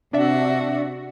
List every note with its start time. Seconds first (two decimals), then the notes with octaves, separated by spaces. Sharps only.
0.13 C3 D4 F#4 D5 E5